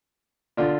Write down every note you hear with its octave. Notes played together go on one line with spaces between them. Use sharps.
D3 D4 F4